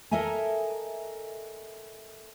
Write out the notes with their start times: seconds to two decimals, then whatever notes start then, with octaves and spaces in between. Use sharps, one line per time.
0.11 A4 A#4 D#5 E5 G#5 A#5